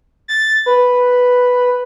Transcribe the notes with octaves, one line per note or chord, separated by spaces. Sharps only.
A6
B4